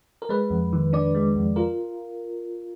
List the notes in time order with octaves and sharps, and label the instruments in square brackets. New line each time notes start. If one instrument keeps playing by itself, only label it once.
[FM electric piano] A#4
G#3 B4
F2
D#3
D4 D5
G#3
F2
F4 A#4